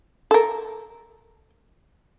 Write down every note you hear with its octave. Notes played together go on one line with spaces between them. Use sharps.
A4 A#4